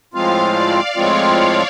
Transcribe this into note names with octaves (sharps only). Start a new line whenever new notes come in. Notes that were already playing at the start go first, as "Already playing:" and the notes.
A2 F3 G#3 C4 F4 F5
D5
A2 F3 G#3 C4 F4 C#5